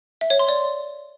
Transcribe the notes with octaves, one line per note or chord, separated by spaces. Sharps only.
E5
C#5
C6
D5